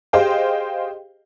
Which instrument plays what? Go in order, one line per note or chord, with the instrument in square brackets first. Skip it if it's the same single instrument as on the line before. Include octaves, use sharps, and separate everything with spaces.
[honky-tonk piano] G4 G#4 C5 D#5 F5 G5